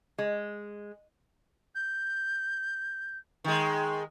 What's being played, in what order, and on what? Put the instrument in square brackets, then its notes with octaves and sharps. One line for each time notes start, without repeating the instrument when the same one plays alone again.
[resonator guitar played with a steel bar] G#3
[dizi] G6
[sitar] D#3 G#3